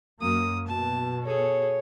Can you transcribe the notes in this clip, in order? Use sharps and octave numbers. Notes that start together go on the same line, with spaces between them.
F#2 A#3 D#6
B2 A5
G#4 A4 C#5